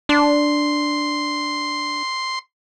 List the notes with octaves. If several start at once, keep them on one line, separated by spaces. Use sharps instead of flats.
D4 C6